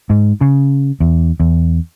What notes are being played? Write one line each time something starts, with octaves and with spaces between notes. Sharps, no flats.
G#2
C#3
E2
E2